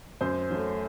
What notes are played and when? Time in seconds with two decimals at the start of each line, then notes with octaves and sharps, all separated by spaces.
0.21 F#2 C5
0.50 F#3 A3